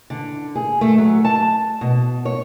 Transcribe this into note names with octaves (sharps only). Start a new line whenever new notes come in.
D3
G#4
A3
F#3
A5
B2
C#5